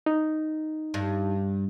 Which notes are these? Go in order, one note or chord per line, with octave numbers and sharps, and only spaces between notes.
D#4
G2